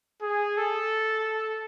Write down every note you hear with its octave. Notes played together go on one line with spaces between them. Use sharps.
G#4
A4